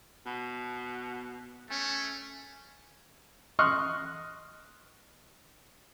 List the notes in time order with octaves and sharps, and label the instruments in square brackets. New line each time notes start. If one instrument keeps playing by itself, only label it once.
[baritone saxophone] B2
[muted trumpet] A3 [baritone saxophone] C#4
[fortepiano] D#5 C6 C#6 D#6 F6 F#6